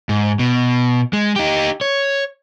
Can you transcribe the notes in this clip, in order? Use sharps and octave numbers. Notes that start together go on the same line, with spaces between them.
G#2
B2
G#3
D#4 G4
C#5